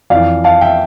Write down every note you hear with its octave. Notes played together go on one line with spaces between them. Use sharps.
F2 E3 D5 F5
F5 A5
E5 G5